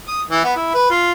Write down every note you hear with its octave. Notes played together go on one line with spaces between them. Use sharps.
D#6
E3
B3
E4
B4
F4